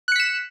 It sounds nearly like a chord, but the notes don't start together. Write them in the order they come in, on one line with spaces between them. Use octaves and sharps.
F#6 C#7 B6 E7